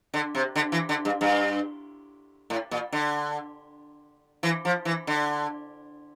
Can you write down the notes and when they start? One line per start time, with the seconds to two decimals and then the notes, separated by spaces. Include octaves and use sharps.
0.14 D3
0.35 C3
0.56 D3
0.72 E3
0.89 D3
1.05 G2
1.21 G2
2.50 A2
2.71 A#2
2.92 D3
4.43 E3
4.65 F3
4.85 E3
5.07 D3